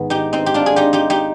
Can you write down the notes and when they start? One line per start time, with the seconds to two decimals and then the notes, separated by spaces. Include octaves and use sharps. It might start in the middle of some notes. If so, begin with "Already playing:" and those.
Already playing: G#2 D#3 B3
0.10 D#4 G4
0.33 C4 D#4
0.46 G4
0.54 D4 F4
0.66 G#4
0.76 D#4 G4
0.93 D#4 G4
1.10 D#4 G4